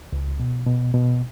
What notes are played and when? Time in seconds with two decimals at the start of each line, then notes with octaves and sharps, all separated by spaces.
0.13 C#2
0.40 B2
0.67 B2
0.94 B2